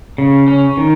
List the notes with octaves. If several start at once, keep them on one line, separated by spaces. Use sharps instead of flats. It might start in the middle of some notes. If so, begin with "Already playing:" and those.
C#3
C#4
D#3